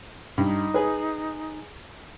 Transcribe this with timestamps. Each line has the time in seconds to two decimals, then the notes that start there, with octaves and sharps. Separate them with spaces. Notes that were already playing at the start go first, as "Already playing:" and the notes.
0.38 G2 D#4
0.74 G#4 B4